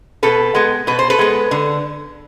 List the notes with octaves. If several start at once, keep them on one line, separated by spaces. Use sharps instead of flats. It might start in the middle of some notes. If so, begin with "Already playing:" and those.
B2 A4 B4
G#3 B3
B2 B4
C5
A4 B4
G#3 B3
D3